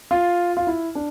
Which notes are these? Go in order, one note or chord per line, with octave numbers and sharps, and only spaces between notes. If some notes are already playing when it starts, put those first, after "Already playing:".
F4
F4
E4
D4